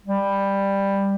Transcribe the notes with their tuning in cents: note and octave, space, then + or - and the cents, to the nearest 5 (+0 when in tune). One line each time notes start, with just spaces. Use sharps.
G3 +10